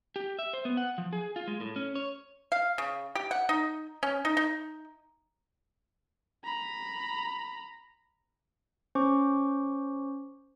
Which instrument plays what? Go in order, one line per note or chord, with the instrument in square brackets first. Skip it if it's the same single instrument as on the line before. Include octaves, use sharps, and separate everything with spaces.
[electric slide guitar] G4
E5
C5
B3
F#5
F3
G#4
F4
G#3
A2
C#4
C#5
[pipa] F5
C#3
G4
F#5
D#4
C#4
D#4
D#4
[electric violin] A#5 B5
[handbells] C#4 C5 C#6 D6